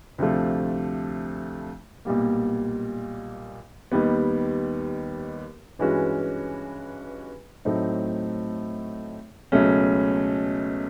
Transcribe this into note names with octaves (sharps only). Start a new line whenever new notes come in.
D2 C3 F3 A3
B1 A#2 G3 A#3
D#2 D#3 G3 B3
G2 E3 G#3 C#4 F#4
A2 F#3 A3 C4 D#4
C#2 B2 F#3 A3 C#4